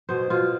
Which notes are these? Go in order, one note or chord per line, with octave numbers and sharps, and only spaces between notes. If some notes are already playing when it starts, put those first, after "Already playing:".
B2 C5
B2 F4